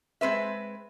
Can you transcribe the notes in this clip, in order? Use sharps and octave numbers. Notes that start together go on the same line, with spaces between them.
G#3 C4 B4 E5